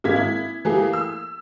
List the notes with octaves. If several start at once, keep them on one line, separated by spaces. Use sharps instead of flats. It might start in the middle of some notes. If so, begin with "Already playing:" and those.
G#1 G#3 A#3 F5 G#6 B6
E4
E3 A3 A#3 G4 G#4
E6